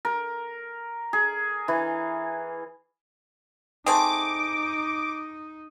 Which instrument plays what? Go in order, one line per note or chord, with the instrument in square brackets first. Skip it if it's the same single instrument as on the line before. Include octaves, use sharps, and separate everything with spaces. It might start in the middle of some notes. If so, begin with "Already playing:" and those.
[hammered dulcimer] A#4
G#4
E3
[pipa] A3 C4 G#4 [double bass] D#4 [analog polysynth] D6